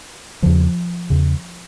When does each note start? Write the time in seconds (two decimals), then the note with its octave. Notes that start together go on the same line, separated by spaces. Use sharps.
0.42 E2 C#3 F3
1.10 E2 C#3